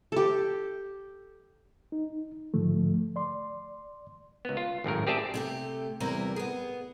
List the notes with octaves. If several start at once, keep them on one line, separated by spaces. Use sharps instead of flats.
G4 A4
D#4
G#2 D3 F3 A3
D5 C6
C#2 B3
F4
G#1 F#2 A2 A#4
C4 G4 G#4 D5 E5 A5
C3 A3 G4
E2 C3 G3 E4 A#4 E5
B3 G#4